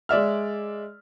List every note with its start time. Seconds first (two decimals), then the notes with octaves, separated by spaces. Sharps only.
0.09 G#3 D5 E5 F6